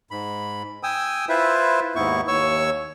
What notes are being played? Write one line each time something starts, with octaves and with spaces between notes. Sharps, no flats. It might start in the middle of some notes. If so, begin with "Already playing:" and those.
G#2 B5
G5 G#5 D#6 E6
E4 F4 B4 C5 E5
D#2 G#2 B3 E4 C#6
D#2 C#5 C#6 E6